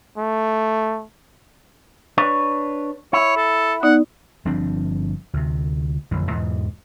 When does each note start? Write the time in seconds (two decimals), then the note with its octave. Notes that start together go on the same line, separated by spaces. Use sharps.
0.17 A3
2.18 D4 B4 C#5
3.13 E4 C#5
3.37 A4
3.83 B3 D#4 D5 F#5
4.45 G1 F3 C4 D4
5.33 D2 C3
6.11 A1 F2 D3
6.28 E2 G#2 B2 E3